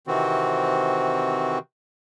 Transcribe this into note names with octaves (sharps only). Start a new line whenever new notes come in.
C3 D#3 E3 C4 F#4